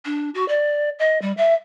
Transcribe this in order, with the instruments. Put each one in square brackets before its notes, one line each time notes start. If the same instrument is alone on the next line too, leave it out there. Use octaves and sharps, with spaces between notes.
[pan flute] D4
F#4
D5
D#5
G3
E5